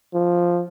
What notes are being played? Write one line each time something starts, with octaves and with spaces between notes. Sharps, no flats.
F3